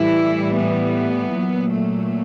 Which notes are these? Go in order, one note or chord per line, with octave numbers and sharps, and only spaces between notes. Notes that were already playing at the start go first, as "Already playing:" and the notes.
Already playing: A2 E3 G3 E4
B3
A#2 F#3
A3